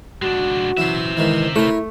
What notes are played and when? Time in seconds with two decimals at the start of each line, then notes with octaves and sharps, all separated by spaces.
0.22 G#3 D4 F#4
0.77 E3 F#3 C#4 C5 E5
1.17 G#2 D#3 E3
1.56 A3 E4 A#4 C#5